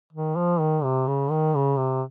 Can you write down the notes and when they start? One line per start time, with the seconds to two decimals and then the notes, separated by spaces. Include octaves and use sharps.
0.13 D#3
0.36 F3
0.60 D#3
0.83 C3
1.07 C#3
1.30 D#3
1.55 C#3
1.78 C3